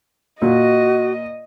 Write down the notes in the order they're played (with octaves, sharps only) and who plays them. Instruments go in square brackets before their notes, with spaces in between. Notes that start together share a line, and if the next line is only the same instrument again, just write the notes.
[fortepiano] A#2 [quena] F#4 [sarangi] D#5